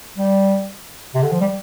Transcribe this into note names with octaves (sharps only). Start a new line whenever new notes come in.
G3
C3
D3
F3
G3